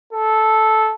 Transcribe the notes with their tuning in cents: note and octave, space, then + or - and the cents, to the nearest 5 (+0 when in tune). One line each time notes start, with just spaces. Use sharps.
A4 -10